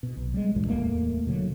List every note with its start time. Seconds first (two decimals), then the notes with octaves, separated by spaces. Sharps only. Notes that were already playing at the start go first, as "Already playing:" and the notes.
0.03 B2
0.17 B1
0.34 G3 G#3
0.55 D2 G2 A#2 E3
0.67 D1 E2 A3 A#3
1.27 B2 D3 F#3